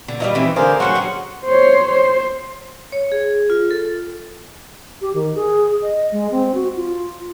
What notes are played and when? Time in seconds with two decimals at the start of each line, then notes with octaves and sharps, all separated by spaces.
0.08 D3
0.20 F#3 G3 A#3 F4 D#5 A#5
0.35 E3 A3 C4 D#4
0.56 D3 G#4 A#4 C5 D5 F5
0.80 F#3 G3 C#4 C5 F#5 C6 C#6
0.95 F#3 G#4
1.46 C5 C#5
1.92 C5
2.92 C#5
3.12 G#4
3.50 F4
3.71 A4
5.01 G4
5.14 D#3
5.35 G#4
5.83 D#5
6.12 G#3
6.31 C4
6.55 F#4
6.76 F4